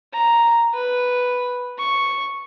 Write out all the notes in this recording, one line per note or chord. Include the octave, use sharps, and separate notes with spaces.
A#5
B4
C#6